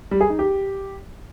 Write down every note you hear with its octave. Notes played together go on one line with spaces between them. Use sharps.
G3
G#4
D#4
G4